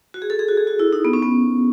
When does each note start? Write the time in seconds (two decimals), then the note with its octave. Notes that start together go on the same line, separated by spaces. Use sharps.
0.14 F#4
0.22 G#4
0.30 A4
0.39 G#4
0.48 F#4
0.57 G#4
0.67 F#4
0.79 E4
0.93 D#4
1.05 B3
1.13 C#4
1.23 B3